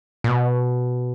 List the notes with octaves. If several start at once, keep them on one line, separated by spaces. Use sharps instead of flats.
A#2
B2